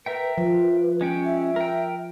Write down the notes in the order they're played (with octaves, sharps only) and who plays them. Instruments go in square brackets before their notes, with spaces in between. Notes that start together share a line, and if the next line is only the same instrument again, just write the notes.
[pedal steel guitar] A#4 E5 G5 [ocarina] B4
[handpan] F3 [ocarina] B4
[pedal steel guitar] G#3 C#4 G5
[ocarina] E5
[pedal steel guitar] A#4 G5